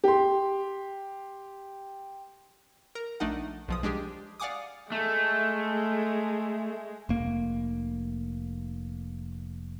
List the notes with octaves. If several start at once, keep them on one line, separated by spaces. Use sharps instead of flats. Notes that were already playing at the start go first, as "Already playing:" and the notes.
G4 C6
A#4
A#1 A3 D4 D#4 F#5
B1 F3 D#6
G#3 D4 G4 G#4
D5 F5 F#5 G#5 D6 D#6
G#3 A3
F1 A#3